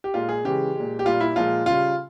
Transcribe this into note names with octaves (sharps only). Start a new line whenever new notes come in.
G4
A#2 G#3 F4
G#4
C#3 E3 G#3 G4
A#2 G#3
G4
A#2 G3 F4
E4
A#2 F3 G#3 F4
C#3 G3 F4